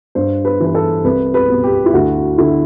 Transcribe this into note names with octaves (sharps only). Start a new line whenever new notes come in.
G2 C5
B4
E3
B4
A4
C2 B4
B4
B2
G4
E4
D2 F#4
D3 E4